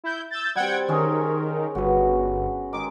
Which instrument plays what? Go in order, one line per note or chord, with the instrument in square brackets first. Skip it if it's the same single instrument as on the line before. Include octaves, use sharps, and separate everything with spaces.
[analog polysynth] E4 G6
E6 G6 A6
[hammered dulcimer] G3 C4 [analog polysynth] F#5 G5 G#6
[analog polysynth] D#3 A#4 [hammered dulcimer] C#4 G#4 C6
[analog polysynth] G1 [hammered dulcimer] F#4 B4
[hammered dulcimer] D#3 G#3 [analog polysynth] D6